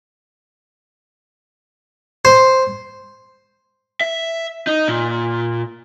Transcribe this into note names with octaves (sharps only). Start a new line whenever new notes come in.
C5
E5
D#4
A#2